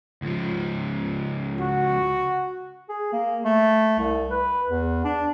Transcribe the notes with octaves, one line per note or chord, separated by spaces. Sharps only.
C#2 F3
F#4
G#4
A#3
A3
C2
B4
E2
D4